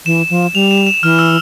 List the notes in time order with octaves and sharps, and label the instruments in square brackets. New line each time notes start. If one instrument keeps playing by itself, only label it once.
[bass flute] E3 [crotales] E7
[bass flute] F3
[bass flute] G3 [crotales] F7
[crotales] E7
E7
[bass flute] E3 [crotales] F6
[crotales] E6